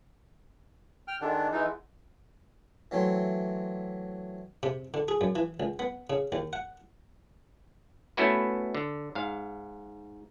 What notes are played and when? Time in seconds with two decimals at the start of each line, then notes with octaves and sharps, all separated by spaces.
1.08 G5 F6
1.21 D#3 G#3 D4 A4 F#5
1.52 E3 G#3 D#4 E4
2.91 E3 F#3 A3 C4
4.63 C3
4.94 D3
5.08 G#4
5.21 F#2
5.36 E3
5.60 C#2
5.79 B3
6.10 C#3
6.32 D#2
6.53 F#5
8.17 A3 B3 C#4 E4 F#4 B4
8.75 D3
9.15 G#2 F5